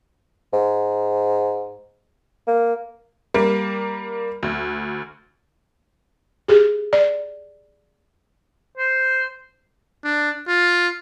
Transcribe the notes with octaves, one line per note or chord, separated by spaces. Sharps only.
G#2
A#3
G3 A#3
D2
G4 G#4
D5
C5
D4
F4